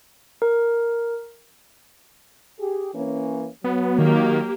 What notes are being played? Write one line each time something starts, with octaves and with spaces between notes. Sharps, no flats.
A#4
G4 G#4
E3 A#3 C#4
F#3 B3
D#3 A#3 G4